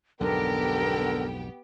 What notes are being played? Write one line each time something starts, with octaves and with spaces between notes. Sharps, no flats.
B1 F2 G#2 D3 B3 G4 A#4 G5